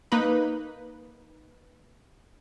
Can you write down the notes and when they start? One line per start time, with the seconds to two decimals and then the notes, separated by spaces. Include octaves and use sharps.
0.12 A#3 D#4 B4